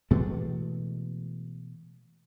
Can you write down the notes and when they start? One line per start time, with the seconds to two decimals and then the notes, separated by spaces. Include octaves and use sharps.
0.11 B2 E3 G#3 A3